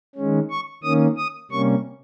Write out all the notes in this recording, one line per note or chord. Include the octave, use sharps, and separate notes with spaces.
D#3 G#3 C#4
C#6
D#3 A#3 C#4 D#6
D#6
C3 G3 A#3 C#4 C#6